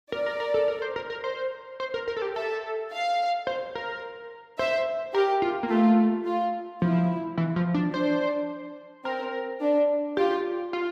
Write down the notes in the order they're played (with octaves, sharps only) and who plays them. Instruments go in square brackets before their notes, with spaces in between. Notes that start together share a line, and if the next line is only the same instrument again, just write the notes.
[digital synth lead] A#4 [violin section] D5
[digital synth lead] A#4
A#4
A4
A#4
C5
A#4
A#4
C5
C5
A#4
A#4
A4
G4
[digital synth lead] A4 [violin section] E5
[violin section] F5
[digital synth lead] C5
A#4
[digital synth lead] C5 [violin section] E5
[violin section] G4 [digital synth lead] A#4
[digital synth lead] F4
A#3
[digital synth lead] A3 [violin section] F4
[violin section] F4
[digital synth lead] F3 [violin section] E4
[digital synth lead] E3
F3
D4
[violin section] D4 [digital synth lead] C5
[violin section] C4 [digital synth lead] A#4
[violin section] D4
[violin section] F4 [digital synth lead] G4
[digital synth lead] F4